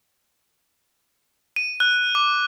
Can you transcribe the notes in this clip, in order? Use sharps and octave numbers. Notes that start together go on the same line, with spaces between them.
D#7
F#6
D6